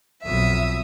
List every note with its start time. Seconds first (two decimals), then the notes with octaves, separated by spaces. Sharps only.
0.24 B1 F2 E5 D#6